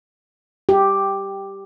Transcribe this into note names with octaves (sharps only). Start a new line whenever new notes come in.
G4